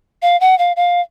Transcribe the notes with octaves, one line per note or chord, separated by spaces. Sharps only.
F5
F#5
F5
F5